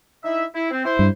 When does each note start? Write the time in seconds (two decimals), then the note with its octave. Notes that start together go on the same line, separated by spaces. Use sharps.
0.25 D#4 E4 E5
0.55 E4
0.71 C4
0.85 E4 C5
0.99 G2